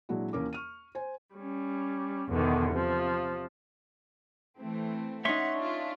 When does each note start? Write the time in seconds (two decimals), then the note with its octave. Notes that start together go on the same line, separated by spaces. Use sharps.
0.09 A#2 F#3 G#3 D4 E4 F#4
0.33 D#2 E3 C#4 A#4 D6
0.53 C#6 F6 D#7
0.95 C5 G#5
1.35 G3 C#4
2.29 E2 B2 D3 D#3
2.71 C3 F3
4.56 E3 A3 C4
5.25 C#4 D#4 E5 F#5 C6 C#6
5.58 D4 F4